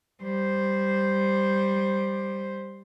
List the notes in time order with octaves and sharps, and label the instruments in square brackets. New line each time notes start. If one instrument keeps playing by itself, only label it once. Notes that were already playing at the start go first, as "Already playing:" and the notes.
[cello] G3 C5